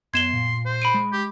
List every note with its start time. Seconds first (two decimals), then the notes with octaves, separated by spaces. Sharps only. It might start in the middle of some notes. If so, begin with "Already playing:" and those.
0.14 F#2 B3 C6 G#6 E7 G7
0.33 A#2
0.65 C5
0.82 B5 D7 D#7
0.94 G#3
1.12 G4